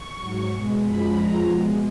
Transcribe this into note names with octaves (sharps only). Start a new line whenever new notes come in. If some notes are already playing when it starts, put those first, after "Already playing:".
Already playing: C#6
G#2 F#3
B2 G#3
F#2 F3 G#3 B5
F2 F3 G#3 A#5
B2 G#3